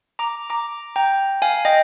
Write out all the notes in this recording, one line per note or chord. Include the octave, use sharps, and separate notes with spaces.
A#5 D6
A#5 D6
G5 A#5
F5 G#5
D#5 G5